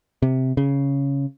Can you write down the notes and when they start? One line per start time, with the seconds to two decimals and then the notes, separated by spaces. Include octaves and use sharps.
0.22 C3
0.57 C#3